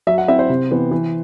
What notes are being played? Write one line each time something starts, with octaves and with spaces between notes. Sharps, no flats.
F#3 E5
F#5
C4 E4 E5
C5
C3
E3 B3
E3